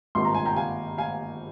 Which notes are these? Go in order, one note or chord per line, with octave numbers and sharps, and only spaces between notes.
G#1 G2 F3 A#3 C6
A#5
G#5
G5 A#5
F5 G#5
F5 G#5